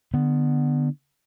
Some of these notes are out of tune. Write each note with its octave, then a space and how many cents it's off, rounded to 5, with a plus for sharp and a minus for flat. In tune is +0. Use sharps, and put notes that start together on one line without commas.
D3 +20 B3 +0